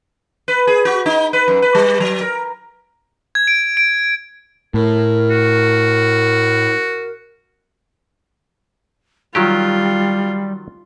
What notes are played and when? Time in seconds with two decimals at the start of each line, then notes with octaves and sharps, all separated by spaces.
0.48 B4
0.67 G#4
0.85 F#4
1.06 D#4
1.33 B4
1.48 F#2
1.62 B4
1.75 G3
2.00 F#3
2.21 A#4
3.35 G#6
3.47 D7
3.77 D7
4.74 A2 A#4
5.30 F#4
9.35 D#3 F#3 G3 F4 G4